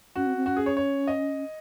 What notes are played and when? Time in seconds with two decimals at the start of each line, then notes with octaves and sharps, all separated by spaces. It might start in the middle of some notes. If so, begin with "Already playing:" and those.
0.15 C#4 F#4
0.26 C4
0.36 C4
0.46 C#4 F#4
0.57 G#4
0.66 C#5
0.77 C#5
1.07 D#5